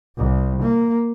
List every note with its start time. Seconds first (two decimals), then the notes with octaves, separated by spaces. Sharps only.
0.17 C2
0.62 A#3